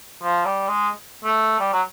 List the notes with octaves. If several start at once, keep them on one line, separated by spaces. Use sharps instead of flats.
F3
G3
G#3
A3
G3
F#3